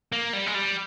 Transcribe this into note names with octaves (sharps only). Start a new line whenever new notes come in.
A#3
G3
G#3
G3